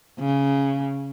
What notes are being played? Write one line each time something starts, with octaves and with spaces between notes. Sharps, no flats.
C#3